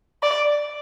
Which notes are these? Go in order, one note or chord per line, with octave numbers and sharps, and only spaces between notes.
D5